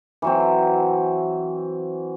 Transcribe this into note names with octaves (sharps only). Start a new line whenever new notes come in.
E3 F#3 C4